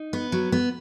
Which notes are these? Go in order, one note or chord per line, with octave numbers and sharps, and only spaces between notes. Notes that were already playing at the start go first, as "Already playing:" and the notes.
Already playing: D#4
B3
F#3
B3